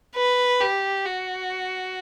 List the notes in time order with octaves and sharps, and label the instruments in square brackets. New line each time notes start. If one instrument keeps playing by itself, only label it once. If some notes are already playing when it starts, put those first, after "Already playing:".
[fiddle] B4
G4
F#4